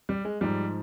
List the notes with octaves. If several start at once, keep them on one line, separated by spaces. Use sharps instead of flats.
G3
G#3
G#2 F3 G3